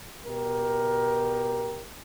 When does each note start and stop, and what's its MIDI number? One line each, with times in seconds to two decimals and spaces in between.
0.26 1.87 47
0.26 1.87 67
0.26 1.87 70